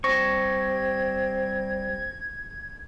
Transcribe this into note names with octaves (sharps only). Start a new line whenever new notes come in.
G3 C4 A5 C#6 G#6 A#6